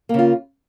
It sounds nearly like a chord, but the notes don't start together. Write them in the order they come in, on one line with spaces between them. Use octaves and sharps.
A#3 C#3 F4